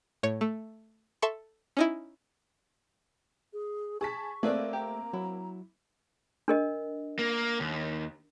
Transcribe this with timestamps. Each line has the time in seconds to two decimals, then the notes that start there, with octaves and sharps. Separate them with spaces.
0.23 A2 C#5
0.41 A3
1.22 A4 E5 C6 C#6
1.77 C#4 D#4 E4
3.53 G#4
4.01 G#4 A5 C#6 B6
4.43 A3 A#3 C4 G#4 B4 D5 E5
4.73 G4 A#5
5.13 F#3 E4
6.48 D4 A#4 D#5
7.19 A#3
7.60 D#2